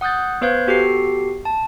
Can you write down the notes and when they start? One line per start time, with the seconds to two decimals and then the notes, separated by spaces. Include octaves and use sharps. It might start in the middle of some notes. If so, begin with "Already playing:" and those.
0.01 F#5 D#6 F#6 G6 A6
0.41 B3 B4 C5 F5 G6 G#6
0.67 B3 F#4 G4 A4 C7
1.45 A5